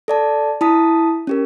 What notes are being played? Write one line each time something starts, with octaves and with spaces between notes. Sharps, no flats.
A4 D5 A5
E4 A5 D#6 B6
C#4 G4 A#4